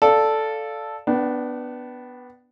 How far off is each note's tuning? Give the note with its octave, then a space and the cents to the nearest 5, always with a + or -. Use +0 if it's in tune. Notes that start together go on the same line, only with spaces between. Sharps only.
A4 +0 D5 +0 F5 +0
B3 +0 D4 +0 G5 -40